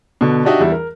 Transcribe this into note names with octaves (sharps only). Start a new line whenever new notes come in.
B2 D3
D4 D#4 F#4 G4 D#5 E5
E2 G3 E4
A#4